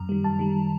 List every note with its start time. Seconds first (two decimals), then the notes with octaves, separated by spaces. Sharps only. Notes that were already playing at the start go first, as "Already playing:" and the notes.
Already playing: F#2 A#5
0.09 D#3 G3
0.24 F#2 A5
0.39 D#3 G3